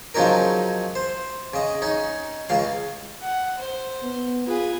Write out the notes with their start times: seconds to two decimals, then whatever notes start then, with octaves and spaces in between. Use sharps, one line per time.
0.15 C#3 F3 F#3 C#4 D#4 A#4
0.95 C5
1.54 C#3 D#5
1.82 C#4 D#4
2.49 C#2 C#3 F5
3.22 F#5
3.57 C5
4.03 B3
4.47 F4 G#4 B4